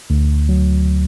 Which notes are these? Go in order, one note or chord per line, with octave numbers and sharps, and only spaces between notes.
D2
F#3